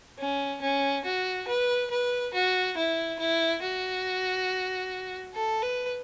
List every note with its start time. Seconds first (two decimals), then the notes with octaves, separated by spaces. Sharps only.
0.19 C#4
0.62 C#4
1.05 F#4
1.48 B4
1.90 B4
2.34 F#4
2.77 E4
3.19 E4
3.62 F#4
5.34 A4
5.62 B4